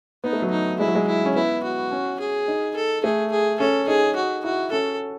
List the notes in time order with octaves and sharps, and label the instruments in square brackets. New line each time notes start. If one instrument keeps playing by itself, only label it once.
[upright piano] B3 [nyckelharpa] D#4
[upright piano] A3
F#3
[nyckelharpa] D#4
[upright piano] G#3 [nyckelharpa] E4
[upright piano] F#3
G#3
[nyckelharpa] E4
[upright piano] C#4
[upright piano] B3 [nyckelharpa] E4
[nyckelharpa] F#4
[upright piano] C#4
[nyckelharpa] G#4
[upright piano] D#4
[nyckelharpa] A4
[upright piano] A3 [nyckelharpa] G#4
[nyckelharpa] G#4
[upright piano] C#4 [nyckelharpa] A4
[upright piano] D#4 [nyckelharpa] G#4
[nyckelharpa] F#4
[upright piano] E4 [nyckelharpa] F#4
[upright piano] C#4 [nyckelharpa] A4